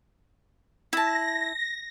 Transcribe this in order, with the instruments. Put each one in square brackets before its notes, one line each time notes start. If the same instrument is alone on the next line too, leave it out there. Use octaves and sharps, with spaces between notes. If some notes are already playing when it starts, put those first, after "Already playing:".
[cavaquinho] E4 A5 [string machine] A#6